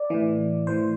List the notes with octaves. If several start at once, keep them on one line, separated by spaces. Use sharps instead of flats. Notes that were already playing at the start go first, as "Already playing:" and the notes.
Already playing: D5
A2 E3
A2 E3 C5